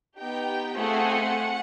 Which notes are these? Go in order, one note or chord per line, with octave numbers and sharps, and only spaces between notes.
B3 D#4 G4 G5
A3 C4 F4 G#4 F#5